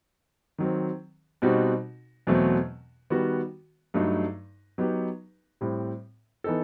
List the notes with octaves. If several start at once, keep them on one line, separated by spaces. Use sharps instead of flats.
D#3 F#3 C4
B2 G3 C4 D#4 F#4
E2 B2 F#3 A3 C4
D#3 G3 B3 F#4
G2 F#3 A3 D#4
F#3 B3 D#4 G4 B4
A2 G3 C4
E3 B3 D#4 A4